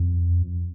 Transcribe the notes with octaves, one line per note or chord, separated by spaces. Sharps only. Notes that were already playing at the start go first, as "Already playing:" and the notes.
Already playing: F2